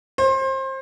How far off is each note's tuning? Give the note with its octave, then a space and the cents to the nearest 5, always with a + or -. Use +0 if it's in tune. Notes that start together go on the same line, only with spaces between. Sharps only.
C5 +30